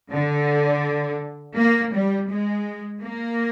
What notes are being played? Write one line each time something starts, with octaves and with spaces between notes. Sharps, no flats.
D3
A#3
G3
G#3
A#3